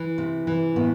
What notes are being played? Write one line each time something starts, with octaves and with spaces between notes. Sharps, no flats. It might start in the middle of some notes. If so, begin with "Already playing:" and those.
Already playing: E3
C3
E3
A2 B3